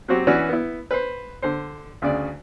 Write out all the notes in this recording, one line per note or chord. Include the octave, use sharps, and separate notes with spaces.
F#3 C4 F#4 G4
E3 C#4 F#4 B4 C#5 D5
B3 E4
B4 C5
D3 C5
D2 C#3 D5